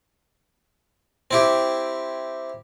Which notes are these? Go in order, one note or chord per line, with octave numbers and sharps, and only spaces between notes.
C4 E4 G4